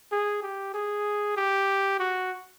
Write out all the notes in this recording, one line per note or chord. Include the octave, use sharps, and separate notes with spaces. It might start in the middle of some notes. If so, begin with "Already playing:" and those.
G#4
G4
G#4
G4
F#4